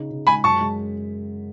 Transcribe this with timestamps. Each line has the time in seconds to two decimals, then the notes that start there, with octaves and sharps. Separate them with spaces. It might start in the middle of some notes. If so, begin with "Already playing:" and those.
Already playing: C#3 D#4
0.11 C#3
0.27 G#3 G#5 B5
0.44 F#2 A5 C#6
0.61 G#3